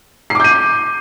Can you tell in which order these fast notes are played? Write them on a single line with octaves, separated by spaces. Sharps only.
C7 D6 G6 D#7